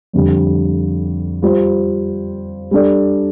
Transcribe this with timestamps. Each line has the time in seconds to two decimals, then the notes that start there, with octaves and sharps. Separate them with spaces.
0.13 F2 D3 G3
1.42 G3 F4 C5
2.71 G3 D4 A4 D5